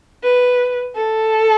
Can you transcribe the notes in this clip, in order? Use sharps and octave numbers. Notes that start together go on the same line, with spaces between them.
B4
A4